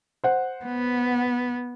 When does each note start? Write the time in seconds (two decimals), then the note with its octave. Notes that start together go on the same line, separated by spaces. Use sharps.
0.24 C5 F#5
0.65 B3